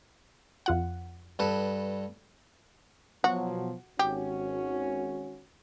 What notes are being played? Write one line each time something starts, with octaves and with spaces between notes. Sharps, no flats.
F2 F4 F#5
G2 A4 B4
B2 F3 F#3 F#4
G#1 C#4 F#4 G4